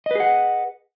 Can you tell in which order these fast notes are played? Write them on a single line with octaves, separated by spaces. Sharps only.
D#5 B4 G#4 F#5